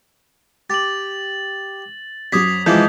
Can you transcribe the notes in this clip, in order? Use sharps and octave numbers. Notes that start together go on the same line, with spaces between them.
G4 A6 F#7
F#2 F#3 C5 D6 D#6 G#6 B6
E3 F3 G#3 A#3 D#5 G6